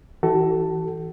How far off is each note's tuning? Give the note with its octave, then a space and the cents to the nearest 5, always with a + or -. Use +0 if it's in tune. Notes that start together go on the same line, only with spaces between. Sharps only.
E3 -20 F#4 +40 A4 +5